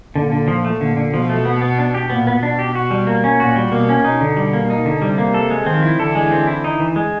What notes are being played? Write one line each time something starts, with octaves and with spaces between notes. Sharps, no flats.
A#2 D3
D3
F3
A3
A#2 D3
D3
B2 F3
A3
B3
B3
D4
G4
A#2 B3
B3
B2 D4
G4
F#4
G3
A#3
C#4
A#2 F#4
G3
B2 A#3
C#4
B2 D#4
D3
G3
A#3
D#4
D3
C3 G3
A#3
A4
G#3
D#3 F3 C4
E4
D3 E3 A4
G#3
C4
E4
D#4
E3
G#3